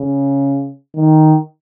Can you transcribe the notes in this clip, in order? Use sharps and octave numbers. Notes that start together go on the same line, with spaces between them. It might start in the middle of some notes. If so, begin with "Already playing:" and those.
Already playing: C#3
D#3